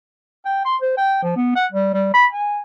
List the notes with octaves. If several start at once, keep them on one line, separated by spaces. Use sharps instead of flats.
G5
C6
C5
G5
F3
B3
F#5
G3
G3
B5
G#5